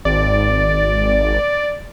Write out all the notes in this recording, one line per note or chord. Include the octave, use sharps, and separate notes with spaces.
G#1 D5